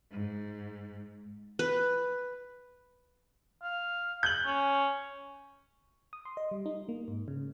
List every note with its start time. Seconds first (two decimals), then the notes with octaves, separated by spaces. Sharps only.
0.11 G#2
1.59 B4
3.63 F5
4.23 G6 F#7
4.45 C#4
6.13 D#6
6.25 C6
6.37 D#5
6.51 G3
6.66 D#4
6.89 A#3
7.08 G#2
7.28 C#3